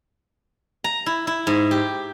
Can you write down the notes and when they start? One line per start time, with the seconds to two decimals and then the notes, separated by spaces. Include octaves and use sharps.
0.84 A#5
1.06 E4
1.27 E4
1.47 G#2
1.71 G4